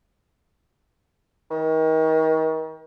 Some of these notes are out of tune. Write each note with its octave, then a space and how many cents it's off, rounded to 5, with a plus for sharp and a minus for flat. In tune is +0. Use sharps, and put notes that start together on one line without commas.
D#3 +35